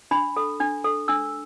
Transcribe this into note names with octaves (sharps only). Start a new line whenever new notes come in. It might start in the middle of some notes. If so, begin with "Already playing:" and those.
D4 B5
A4
D4
A4
D4 E6